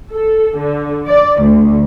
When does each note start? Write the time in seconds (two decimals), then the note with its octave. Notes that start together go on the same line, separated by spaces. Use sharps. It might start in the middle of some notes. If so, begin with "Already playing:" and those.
0.12 A4
0.58 D3
1.07 D5
1.42 D2